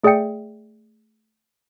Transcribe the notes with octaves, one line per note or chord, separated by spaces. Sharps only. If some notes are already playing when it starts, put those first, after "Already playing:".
A3 G#4 D5 E5 G5 C#7